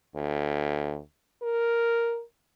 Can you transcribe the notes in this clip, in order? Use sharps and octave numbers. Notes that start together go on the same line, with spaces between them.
D2
A#4